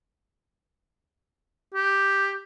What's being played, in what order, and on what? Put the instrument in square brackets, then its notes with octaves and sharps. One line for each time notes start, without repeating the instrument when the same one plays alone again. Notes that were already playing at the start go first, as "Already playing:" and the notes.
[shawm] G4